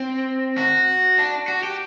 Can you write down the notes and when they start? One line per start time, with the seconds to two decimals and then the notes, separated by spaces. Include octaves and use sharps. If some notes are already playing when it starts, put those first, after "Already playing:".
Already playing: C4
0.58 F#4
1.18 D4
1.48 F#4
1.63 G4